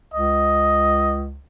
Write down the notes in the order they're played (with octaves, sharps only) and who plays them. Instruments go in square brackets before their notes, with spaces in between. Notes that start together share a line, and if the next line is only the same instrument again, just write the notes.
[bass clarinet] C#2 [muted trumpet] D#5